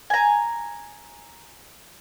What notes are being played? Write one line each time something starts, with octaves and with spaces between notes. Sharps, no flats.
G#5 A#5